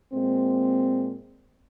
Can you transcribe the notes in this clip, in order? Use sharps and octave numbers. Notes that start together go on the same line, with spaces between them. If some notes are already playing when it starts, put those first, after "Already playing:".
A#2 G#3 C4